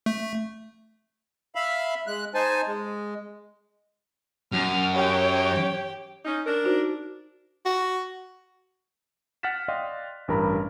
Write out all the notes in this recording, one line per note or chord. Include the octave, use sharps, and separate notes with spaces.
A3
E5 F5 B5
G#3 F#6
D#4 C5 G#5 A5
G#3
F#2 F6
G4 C#5 G5
C#4 D#4
D4 A#4
D#4 F#4 C5
F#4
F#5 F6 F#6 A6 B6 E7
D5 D#5 F5 G5 C6
A1 G2 A#4 A#5 B5